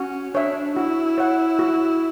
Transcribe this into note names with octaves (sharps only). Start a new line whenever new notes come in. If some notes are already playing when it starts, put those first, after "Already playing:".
Already playing: C#4 F#4
D4 C#5 E5
E4 F#4
C#5 F#5
F#4